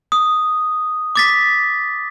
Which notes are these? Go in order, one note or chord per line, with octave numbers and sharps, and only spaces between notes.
D#6
D6 A6 B6